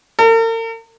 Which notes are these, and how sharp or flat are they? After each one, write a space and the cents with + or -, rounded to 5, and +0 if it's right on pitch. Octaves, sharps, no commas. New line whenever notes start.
A#4 -45